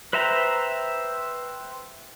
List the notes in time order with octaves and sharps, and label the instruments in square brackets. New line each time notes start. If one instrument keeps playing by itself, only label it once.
[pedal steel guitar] B4 C5 E5 G5 A#5